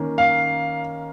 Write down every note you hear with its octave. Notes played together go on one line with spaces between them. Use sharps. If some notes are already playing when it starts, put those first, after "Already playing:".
Already playing: D#3 A#3 C#4
F5